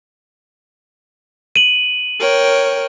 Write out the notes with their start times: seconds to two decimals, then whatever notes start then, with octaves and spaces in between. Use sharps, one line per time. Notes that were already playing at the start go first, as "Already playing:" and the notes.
1.56 D#7 F#7
2.18 A#4 C#5 G5